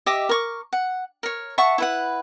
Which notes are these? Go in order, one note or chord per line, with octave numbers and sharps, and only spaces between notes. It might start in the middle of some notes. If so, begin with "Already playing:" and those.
G4 D#5 E5 D6
A#4 C#6 D6
F#5
A#4 C#5
E5 F#5 A5 C#6
E4 B4 F#5